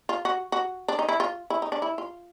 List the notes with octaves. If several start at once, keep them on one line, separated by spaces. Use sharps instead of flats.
F4
F#4
F#4
D4
D#4
E4
F4
E4
D#4
D4
E4
F4